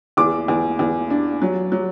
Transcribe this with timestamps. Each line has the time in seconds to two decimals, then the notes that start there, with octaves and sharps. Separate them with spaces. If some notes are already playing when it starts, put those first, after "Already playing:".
0.17 E2 D6
0.48 E2
0.79 E2
1.10 D4
1.42 F#3
1.72 F#3